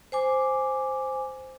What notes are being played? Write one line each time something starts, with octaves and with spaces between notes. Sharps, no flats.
C5 G#5 D6